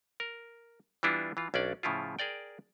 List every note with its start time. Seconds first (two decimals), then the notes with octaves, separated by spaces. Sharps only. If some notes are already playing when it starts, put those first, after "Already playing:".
0.20 A#4
1.03 E3 G3 B3 D4 E4 F4
1.37 E3 F4
1.54 B1 C#4 D4 D5
1.83 A2 C#3 F3 E4 F4
2.19 G#4 A#4 D5 G5